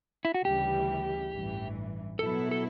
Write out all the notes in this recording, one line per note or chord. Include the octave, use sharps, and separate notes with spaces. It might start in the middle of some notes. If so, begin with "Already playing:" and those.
E4
F#4
D2 C#3 E3 G3 G4
A1 G2 E3
B2 F#3 B3 E4 A4
A4